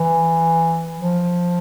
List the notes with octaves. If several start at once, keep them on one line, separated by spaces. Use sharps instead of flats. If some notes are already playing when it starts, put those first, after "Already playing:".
Already playing: E3
F3